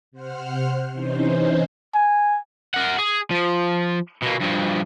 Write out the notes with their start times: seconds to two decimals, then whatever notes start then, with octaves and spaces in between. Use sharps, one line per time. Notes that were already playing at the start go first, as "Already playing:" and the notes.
0.12 C3 C5 F#5 F6
0.92 C3 E3 C#4 D#4 C5
1.95 G#5
2.74 A#4 F#5
2.98 G#4
3.31 F3
4.23 B2 A#3
4.41 G2 F3